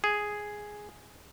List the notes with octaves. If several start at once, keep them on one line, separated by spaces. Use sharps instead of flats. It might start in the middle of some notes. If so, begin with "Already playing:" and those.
G#4